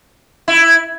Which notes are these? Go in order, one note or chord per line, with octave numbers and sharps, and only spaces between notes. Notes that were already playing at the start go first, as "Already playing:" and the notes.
E4